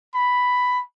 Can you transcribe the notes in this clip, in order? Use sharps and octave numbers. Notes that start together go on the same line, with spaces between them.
B5